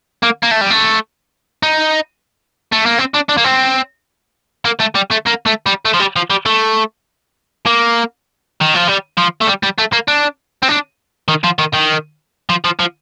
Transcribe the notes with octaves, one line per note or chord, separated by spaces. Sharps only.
A#3
A#3
A3
G3
A3
D#4
A3
A#3
C4
D4
D4
A#3
C4
A#3
A3
G3
A3
A#3
A3
G3
A3
F3
G3
F3
G3
A3
A#3
D#3
F3
G3
F3
A3
G3
G3
A3
A#3
D4
C4
D4
D#3
F3
D#3
D#3
F3
F3
F3